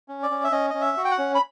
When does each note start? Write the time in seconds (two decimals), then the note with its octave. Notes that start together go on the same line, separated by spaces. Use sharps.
0.08 C#4
0.23 D5
0.30 C#4
0.44 E5
0.52 C#4 D#5
0.70 C#4 D#5
0.81 E5
0.97 F#4
1.05 G5
1.11 F#5
1.18 C#4
1.35 B5